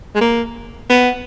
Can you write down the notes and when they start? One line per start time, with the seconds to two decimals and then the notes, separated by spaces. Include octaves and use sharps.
0.15 G#3
0.21 A#3
0.89 B3